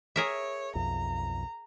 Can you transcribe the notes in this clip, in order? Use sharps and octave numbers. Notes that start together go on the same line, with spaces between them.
G#4 A#4 C#5 E5
B1 F2 A#5